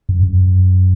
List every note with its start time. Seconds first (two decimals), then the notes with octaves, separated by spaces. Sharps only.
0.09 F#2
0.23 F#2